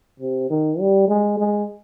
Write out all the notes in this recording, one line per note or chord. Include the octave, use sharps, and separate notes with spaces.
C3
D#3
G3
G#3
G#3